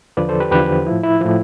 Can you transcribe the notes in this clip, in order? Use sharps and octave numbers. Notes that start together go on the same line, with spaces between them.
E2 D3 F3 B4 D5
A4 C5
G4 B4
E2 D3 F3 G4 B4
A2 F3 E4
E4
A2 F3